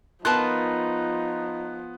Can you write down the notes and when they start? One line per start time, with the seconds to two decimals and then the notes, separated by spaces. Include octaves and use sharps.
0.25 F3 B3 D#4 F4 A#4 A5 F#6